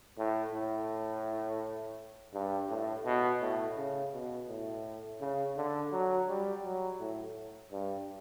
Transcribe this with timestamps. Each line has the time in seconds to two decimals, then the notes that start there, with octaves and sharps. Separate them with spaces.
0.18 A2
0.54 A2
2.34 G2
2.69 A2
3.05 B2
3.41 A2
3.77 C#3
4.13 B2
4.49 A2
5.21 C#3
5.57 D3
5.92 F#3
6.29 G3
6.64 F#3
7.00 A2
7.72 G2